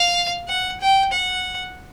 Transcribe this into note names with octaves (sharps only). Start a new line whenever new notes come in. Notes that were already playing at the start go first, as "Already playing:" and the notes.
Already playing: F5
F#5
G5
F#5